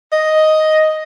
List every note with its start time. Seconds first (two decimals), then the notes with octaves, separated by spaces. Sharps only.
0.12 D#5